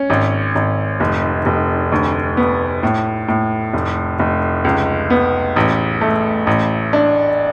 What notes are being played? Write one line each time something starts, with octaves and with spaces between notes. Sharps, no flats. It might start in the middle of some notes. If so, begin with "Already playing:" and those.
Already playing: C#4
G#1
G#1
F1
F1
D2
B3
A2
A2
F1
F1
C#2
B3
A1
A3
A1
D4